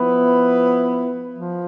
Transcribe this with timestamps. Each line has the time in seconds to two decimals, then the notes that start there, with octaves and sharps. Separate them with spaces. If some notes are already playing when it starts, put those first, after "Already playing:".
Already playing: F3 B3 E4 B4
1.38 F3